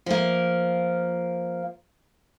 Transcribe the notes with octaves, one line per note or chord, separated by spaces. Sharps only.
F3 A#3